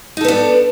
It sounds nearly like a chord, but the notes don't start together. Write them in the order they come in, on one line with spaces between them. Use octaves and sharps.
D#4 A4 B3 D4